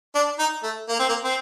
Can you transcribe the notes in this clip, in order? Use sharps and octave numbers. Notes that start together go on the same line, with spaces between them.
D4
D#4
A3
A#3
C4
A#3
C4